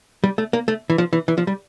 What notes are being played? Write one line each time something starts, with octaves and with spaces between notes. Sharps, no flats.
G3
A3
A#3
A3
E3
F3
E3
E3
F3
G3